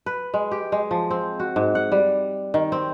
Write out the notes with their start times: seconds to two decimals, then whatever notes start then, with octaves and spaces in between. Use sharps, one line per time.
0.06 B4
0.34 G#3
0.52 G4
0.72 G#3
0.91 F3
1.11 C4
1.40 F#4
1.56 G#2
1.75 F#5
1.92 G3
2.54 D#3
2.72 C4